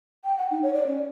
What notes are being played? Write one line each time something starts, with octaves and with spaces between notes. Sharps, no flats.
G5
F#5
D#4
C#5
D5
C#4